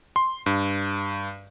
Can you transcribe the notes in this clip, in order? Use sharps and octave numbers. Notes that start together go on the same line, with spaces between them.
C6
G2